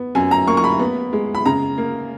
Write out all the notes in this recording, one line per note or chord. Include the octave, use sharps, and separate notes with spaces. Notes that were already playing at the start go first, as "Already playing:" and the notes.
Already playing: B3
F#2 G#5
A#5
A#3 C#6
C#6
B5
B3
G#3
B5
C#3 A#5
A#3